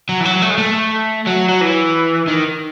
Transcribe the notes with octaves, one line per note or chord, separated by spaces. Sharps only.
F#3
E3
F#3
A3
G#3
A3
F#3
F#3
E3
D#3